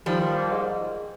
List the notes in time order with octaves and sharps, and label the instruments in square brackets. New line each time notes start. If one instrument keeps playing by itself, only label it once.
[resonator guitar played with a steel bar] D#3 G3 [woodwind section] F3
[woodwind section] F3
A#3
G#2